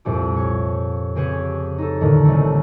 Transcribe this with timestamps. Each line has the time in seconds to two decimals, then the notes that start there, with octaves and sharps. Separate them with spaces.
0.05 C2 F2 A#2 G4 D6
0.36 C#5
1.15 C#3 C4 G4 G#4 B4 C#5
1.78 D#4 A4
2.01 D#2 A2 D3 D#3
2.25 C2 C#3 A3